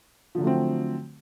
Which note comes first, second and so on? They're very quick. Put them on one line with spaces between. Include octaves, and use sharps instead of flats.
F3 D3 F#3 A3 C4